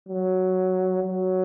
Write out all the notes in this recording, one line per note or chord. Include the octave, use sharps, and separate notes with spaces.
F#3
F#3